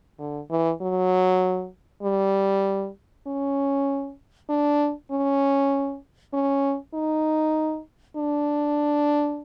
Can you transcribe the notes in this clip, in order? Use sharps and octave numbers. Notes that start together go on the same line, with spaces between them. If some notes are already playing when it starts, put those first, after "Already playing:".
D3
E3
F#3
G3
C#4
D4
C#4
C#4
D#4
D4